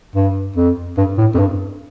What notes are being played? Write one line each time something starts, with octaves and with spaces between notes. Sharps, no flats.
G2
F2
G2
A2
F2
G2